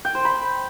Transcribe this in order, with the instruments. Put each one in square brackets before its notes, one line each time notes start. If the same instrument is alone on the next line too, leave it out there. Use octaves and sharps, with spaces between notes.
[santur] G5
C5
B5